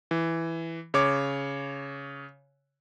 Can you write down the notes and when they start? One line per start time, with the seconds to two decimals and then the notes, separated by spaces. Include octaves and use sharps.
0.11 E3
0.94 C#3 C#5 D6